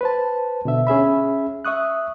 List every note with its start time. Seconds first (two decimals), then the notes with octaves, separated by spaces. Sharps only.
0.01 B4 C5 A5
0.65 B2 D3 E5
0.87 C#4 G#4 E5 B5
1.65 E5 C#6 D#6 F#6